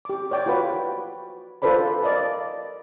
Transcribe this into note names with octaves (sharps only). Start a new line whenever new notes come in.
G4 D6
C#5 D5 G5 D6
F4 F#4 B4
F4 A4 B4 C5 D5 B5
A#4 D5 D#5 F5 A5